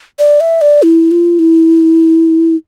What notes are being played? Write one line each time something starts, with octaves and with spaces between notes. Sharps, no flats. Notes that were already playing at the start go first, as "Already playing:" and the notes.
D5
E5
D5
E4
F4
E4